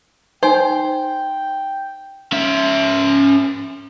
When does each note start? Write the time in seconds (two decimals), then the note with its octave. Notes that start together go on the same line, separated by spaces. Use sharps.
0.43 D#4 C5 G5 G#5
2.32 C#4 E5